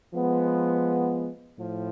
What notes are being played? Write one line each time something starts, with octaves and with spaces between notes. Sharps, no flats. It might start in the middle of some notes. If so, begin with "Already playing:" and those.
F3 G#3 B3
A2 F3